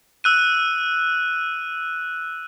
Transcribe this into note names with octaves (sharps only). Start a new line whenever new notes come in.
E6 F#6 D#7